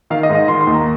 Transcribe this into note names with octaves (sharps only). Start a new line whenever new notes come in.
D#3 F5
D#5
G#2
D#5
D#3 C6
C6
D#2
A#5